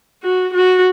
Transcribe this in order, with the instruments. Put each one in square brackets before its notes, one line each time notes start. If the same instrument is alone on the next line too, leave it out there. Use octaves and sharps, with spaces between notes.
[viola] F#4
F#4